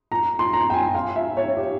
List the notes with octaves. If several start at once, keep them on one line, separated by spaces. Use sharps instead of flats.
A#5
C6
A#5
G5
G#5
F5
E5
C#5
G4